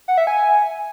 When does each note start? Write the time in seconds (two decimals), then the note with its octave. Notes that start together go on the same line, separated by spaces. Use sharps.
0.08 F#5
0.18 E5
0.27 G#5